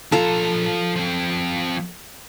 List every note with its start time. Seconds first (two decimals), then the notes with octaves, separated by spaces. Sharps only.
0.12 F3 F4 A4 A#5
0.96 F3 C4